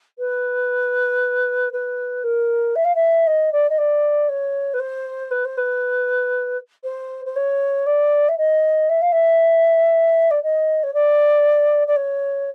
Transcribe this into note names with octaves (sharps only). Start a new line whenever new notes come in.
B4
B4
A#4
E5
F5
E5
D#5
D5
D#5
D5
C#5
B4
C5
B4
C5
B4
C5
C5
C#5
D5
E5
D#5
E5
F5
E5
D5
D#5
C#5
D5
D5
C#5